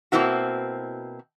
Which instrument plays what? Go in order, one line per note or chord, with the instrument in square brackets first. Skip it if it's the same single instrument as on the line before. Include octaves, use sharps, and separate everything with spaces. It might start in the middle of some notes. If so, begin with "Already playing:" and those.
[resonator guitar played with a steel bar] B2 A#3 C4 E4 F#4